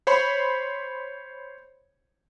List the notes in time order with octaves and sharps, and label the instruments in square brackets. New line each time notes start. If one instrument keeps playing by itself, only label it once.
[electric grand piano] C5 C#5 B5 C6